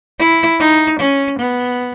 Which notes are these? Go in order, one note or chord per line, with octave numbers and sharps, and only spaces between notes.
E4
D#4
C#4
B3